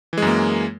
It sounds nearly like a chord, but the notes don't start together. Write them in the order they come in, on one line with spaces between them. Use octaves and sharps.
E3 G#3 F#2 A#3